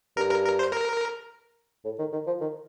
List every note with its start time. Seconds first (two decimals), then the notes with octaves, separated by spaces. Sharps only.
0.17 G2 A#4
0.31 A#4
0.45 A#4
0.59 C5
0.73 A#4
1.85 A2
1.99 D#3
2.12 D#3
2.27 F3
2.41 D#3